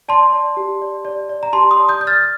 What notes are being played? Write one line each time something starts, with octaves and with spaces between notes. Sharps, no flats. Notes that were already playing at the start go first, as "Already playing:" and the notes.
D5 A5 C6
D5
G4
D5
D5
D5
A#5
G4 A5 C6
C6 D#6
D5
D#6 G6
D5 G6
F6 A6